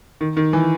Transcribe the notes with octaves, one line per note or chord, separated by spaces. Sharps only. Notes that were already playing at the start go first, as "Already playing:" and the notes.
D#3
D#3
E3